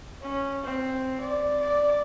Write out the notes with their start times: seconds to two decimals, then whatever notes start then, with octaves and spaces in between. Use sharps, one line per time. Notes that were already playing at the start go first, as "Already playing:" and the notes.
0.22 C#4
0.63 C4
1.21 D5
1.61 D5